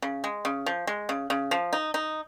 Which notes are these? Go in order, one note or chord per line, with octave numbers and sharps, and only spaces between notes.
C#3
G#3
C#3
F3
G#3
C#3
C#3
F3
D#4
D#4